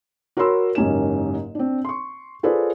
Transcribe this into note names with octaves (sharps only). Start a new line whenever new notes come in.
F#4 A#4 C#5 B5 C6 E6
F#1 G#2 C#4 G4 A#4 E7
C4 D4
C6 C#6
F4 G#4 A4 B4 C5 D5